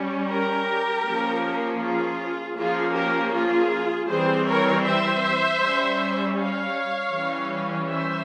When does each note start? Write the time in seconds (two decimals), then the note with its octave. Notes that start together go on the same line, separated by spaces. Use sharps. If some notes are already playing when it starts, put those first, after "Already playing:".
Already playing: G3 C#4
0.29 G4 A#4
1.05 F3 A#3 C#4
1.81 F4 G#4
2.57 F3 A#3 C#4 F4 G#4
2.95 G4 A#4
3.33 F4 G#4
4.09 E3 G3 C4 G#4 C5
4.47 A#4 C#5
4.85 C5 E5
5.61 G3 C#4
6.37 C#5 F5
7.14 E3 G3 C#4
7.89 C5 E5